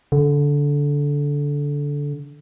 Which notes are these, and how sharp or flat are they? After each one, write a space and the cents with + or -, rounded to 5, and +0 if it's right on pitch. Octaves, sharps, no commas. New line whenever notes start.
D3 -20